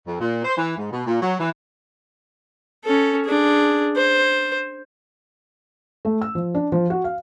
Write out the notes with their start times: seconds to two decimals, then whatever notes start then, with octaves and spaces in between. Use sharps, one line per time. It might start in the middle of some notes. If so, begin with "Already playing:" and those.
0.06 F2
0.20 A#2
0.44 C5
0.57 E3
0.77 G#2
0.91 B2
1.06 A#2
1.22 F#3
1.39 E3
2.85 C#4 A4
3.25 D4 G#4
3.96 C5
6.05 A3
6.22 E6
6.35 F3
6.55 D4
6.72 F3
6.90 F#4
7.04 F5